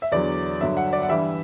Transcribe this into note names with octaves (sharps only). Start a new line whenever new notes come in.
E5
E2 D3 F#3 D5
G2 D3 F#3 E5
F#5
D5
F#5
G2 E3 G3 E5